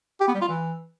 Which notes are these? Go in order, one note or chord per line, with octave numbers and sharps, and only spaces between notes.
G4
B3
G3
F4
E3